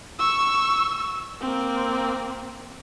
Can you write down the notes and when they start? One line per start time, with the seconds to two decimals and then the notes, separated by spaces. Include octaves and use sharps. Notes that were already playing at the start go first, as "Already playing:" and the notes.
0.19 C#6 E6
1.40 A#3 C4